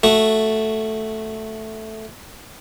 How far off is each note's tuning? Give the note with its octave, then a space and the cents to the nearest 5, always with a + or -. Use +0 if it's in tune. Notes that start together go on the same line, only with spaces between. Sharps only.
A3 +0 F#4 +0